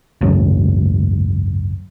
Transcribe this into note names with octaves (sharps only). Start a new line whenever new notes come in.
G#1 C#2 F#2